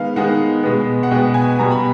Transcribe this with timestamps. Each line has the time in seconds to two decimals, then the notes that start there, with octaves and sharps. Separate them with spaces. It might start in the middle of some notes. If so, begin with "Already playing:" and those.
Already playing: D#3 G#3 B3 F5
0.16 D#3 G#3 B3 F#5
0.63 B2 G#3 B3
1.03 F#5
1.11 B2 G#3 B3 G5
1.34 G#5
1.59 B2 G3 B3 A#5
1.71 B5